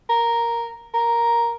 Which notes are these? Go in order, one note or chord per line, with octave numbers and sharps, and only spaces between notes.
A#4
A#4